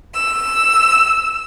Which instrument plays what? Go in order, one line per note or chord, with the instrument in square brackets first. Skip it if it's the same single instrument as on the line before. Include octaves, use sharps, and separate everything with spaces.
[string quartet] E6